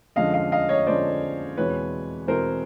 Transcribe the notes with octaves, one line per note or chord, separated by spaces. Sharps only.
F2 D3 F3 G#3 C#4 D#5 F5
D#5 F5
D#5 F5
C#5 D#5
F2 D3 F3 G#3 C#4 C5 D5
E2 B2 G#3 C4 E4 B4 C#5
E2 B2 G#3 C4 E4 A#4 C5